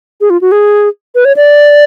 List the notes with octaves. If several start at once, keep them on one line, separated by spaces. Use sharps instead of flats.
G#4
F4
F#4
G#4
B4
C#5
D5